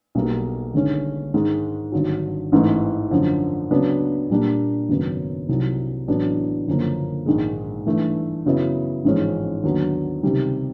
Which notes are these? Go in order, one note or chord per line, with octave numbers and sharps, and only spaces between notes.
B1 B2 G3 A#3
G1 G2 D#3 G#3 C#4
G#2 D#3 G#3
G#1 G2 D3 F#3
A1 G#2 E3 A3
F#2 D3 F3
C#2 C#3 F#3 B3 D4
A#2 G3 A#3 D4
G#1 F#2 C#3 F#3 B3
C2 C3 D#3 F#3
A1 A2 F#3 B3 D4
G1 F#2 C#3 F3 A#3
A#1 G#2 D#3 G#3
G2 E3 A3
F#2 C#3 F#3 B3 E4
A1 G#2 F3 G#3 C#4
D#2 D3 F#3 B3
C#2 C3 D#3 G3